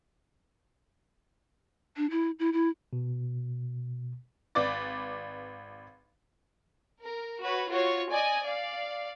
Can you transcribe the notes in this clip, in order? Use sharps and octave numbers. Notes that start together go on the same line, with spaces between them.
D4
E4
E4
E4
B2
G#1 B4 D5 D6 A6
A#4
F#4 B4 C#5
F4 F#4 C#5
D5 D#5 G#5
D5 F5